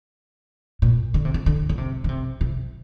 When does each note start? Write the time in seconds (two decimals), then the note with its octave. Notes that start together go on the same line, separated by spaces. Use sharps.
0.82 A#2
1.14 D3
1.25 C3
1.34 D3
1.46 D3
1.69 D3
1.78 C3
2.04 D3
2.09 C3
2.41 C3